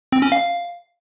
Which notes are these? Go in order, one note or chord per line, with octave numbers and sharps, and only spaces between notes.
C4
C#4
F5